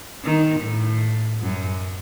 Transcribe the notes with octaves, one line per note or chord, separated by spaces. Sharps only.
D#3
A2
F#2